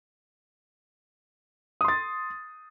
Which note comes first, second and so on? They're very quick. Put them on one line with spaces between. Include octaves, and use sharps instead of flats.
D#6 C6 A6